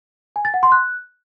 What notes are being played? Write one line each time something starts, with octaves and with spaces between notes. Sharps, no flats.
G#5
A6
F#5
C6
F#6